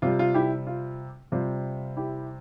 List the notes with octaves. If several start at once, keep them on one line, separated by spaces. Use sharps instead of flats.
C3 G3 F4
F4
E4 G4
F4
C3 G3 F4
E4 G4